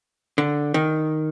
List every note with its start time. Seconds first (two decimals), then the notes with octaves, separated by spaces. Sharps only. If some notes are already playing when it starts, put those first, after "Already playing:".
0.38 D3
0.74 D#3